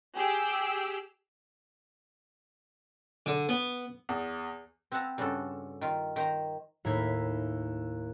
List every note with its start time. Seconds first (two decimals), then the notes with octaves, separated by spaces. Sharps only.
0.16 G4 G#4 E6
3.26 D3
3.49 B3
4.09 E2
4.92 C4 B4 E5 F#5 A5 A#5
5.18 G2 C#3 F4 F#4 A4
5.81 D#3 F4
6.16 D#3 C5 A#5
6.85 D#2 A2 E4 A#4 G#6 B6